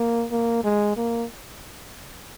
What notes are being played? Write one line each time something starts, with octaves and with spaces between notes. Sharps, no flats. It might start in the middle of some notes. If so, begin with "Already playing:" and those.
Already playing: A#3
A#3
G#3
A#3